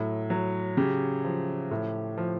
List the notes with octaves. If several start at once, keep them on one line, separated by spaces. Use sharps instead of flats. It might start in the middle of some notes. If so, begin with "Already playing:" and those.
Already playing: A2 F#3
F#3
C#3 G4
F3
A2
F3